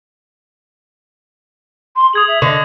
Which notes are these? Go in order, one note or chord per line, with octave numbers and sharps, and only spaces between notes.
C6
G#4 D#6 G#6 F#7
E5
D3 D#5 C#6